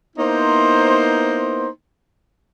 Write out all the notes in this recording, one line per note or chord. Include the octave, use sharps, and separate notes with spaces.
A#3 B3 D#4 E4 C5